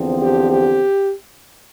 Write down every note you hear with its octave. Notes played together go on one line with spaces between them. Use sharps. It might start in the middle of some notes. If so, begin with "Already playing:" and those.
Already playing: E2 D3 F3 C4
G4
G4